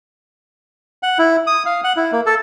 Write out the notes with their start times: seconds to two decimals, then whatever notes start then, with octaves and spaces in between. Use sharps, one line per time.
1.03 F#5
1.19 E4
1.47 D#6
1.66 F5
1.84 F#5
1.97 E4
2.12 A#3
2.26 A4